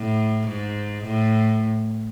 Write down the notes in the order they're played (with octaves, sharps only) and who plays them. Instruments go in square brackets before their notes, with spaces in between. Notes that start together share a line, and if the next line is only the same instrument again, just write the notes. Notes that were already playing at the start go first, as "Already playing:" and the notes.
Already playing: [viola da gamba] A2
G#2
A2